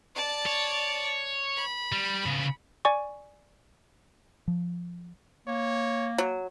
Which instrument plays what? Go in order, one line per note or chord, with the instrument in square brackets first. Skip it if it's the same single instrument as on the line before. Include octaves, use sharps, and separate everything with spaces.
[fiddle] D5 A5
[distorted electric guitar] C#5
[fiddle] B5
[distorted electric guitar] G3
C#3 B3
[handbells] D5 G#5 C#6
[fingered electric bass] F3
[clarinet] A#3 [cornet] C#5
[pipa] F#3